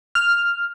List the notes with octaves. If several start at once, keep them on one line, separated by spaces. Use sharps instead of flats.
F6